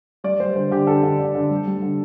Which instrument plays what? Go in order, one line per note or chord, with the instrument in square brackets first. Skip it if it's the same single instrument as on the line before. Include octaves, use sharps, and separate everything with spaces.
[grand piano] G3 D5
G3 C5
D3 C5
D3 G4
D3 A4
D3
D3
D3
G3
G3
D3